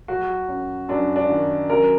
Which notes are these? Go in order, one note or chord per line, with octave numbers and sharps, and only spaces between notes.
F#3 F#4
F#2
F#2 D4
D4
D#3
F#2 A#4